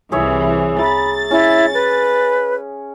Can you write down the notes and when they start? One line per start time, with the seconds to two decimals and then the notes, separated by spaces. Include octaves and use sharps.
0.12 C2 E3 G#4 C#5 E5
0.81 A#5 B5 A6
1.31 C#4 E4
1.73 B4